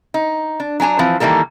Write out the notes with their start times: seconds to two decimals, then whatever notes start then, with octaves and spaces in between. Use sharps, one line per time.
0.14 D#4
0.60 D4
0.80 F#3 D4 G#5 A#5
0.99 E3 F3 C4
1.20 D#3 E3 G3 A#3 A4